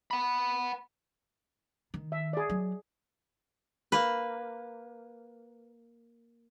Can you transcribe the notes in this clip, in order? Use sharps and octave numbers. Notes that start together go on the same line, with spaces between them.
F#5 B5
D#3
E5
G#4 D5
F#3
A#3 B4